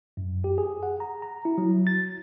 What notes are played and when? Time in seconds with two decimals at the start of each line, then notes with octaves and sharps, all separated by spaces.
0.17 F#2
0.44 G4
0.58 G#4
0.83 F#5
1.00 A#5
1.22 A#5
1.45 E4
1.58 F#3
1.87 A6